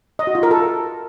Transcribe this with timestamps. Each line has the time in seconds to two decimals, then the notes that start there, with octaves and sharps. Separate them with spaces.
0.19 D#5
0.27 F#4
0.35 F4
0.43 A#4
0.51 A4